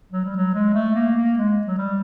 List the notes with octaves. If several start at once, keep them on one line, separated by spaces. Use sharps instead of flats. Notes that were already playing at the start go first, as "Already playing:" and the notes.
F#3
G3
F#3
G#3
A3
A#3
A#3
G#3
F#3
G3